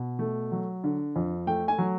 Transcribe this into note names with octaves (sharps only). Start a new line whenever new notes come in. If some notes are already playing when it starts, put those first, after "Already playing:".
Already playing: B2
A3
F#3
D3
F2
A3 G5
G#5
F#3